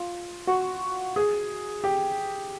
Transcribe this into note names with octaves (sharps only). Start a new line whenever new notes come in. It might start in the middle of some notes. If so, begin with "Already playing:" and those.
Already playing: F4
F#4
G#4
G4